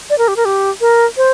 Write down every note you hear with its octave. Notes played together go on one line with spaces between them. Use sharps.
D5
A#4
G4
A#4
G4
A#4
C5